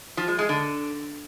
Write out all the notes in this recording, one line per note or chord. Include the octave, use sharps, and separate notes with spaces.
F3
G#3
G#3
D3